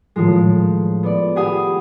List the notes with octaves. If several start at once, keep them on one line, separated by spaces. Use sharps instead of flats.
A2 D#3 F3 G#3
B3 D5
G4 G#4 F#5 G#5 B5 D#6